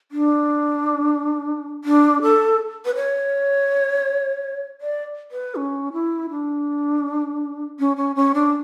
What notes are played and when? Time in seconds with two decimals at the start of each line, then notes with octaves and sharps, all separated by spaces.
0.11 D4
1.84 D4
2.22 A4
2.85 B4
2.96 C#5
4.81 D5
5.31 B4
5.55 C#4
5.93 E4
6.30 D4
7.79 C#4
7.97 C#4
8.15 C#4
8.34 D4